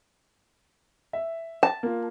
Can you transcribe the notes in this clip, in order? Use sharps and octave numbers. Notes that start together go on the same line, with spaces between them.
E5
A5
A#3 F4